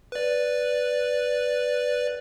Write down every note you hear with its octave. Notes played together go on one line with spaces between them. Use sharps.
B4 D5